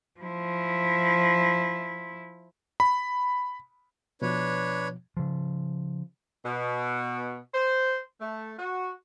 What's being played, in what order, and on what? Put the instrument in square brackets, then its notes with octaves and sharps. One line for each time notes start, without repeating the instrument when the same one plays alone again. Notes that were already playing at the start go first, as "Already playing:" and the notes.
[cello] F3 E4
[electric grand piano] B5
[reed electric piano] B2 F3 [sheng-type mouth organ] D4 B4 C#5
[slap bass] C#3 F3
[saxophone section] B2
C5
A3
F#4